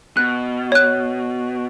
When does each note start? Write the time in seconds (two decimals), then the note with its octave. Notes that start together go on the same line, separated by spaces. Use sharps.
0.17 B2 F#6
0.72 C#5 F#6